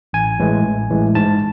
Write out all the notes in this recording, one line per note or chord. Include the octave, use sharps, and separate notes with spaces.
A1 G#5
A2 E3 G#3
A1
A2 E3 G#3
G#2 A5